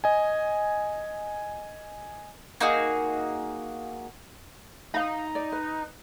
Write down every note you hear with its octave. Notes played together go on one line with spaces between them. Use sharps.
D#5 G#5
A#3 D#4 F#4 G#4
D#4 F5 B5
D5
B4